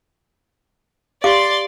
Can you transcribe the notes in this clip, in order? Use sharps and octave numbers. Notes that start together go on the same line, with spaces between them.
G4 D5 F5 C6 D6